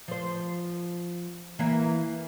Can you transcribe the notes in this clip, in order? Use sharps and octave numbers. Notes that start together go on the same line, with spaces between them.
F3 C5
E3 A#3 E5